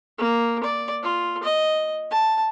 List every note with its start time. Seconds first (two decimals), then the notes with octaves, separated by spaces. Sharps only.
0.18 A#3
0.63 D5
1.03 F4
1.43 D#5
2.11 A5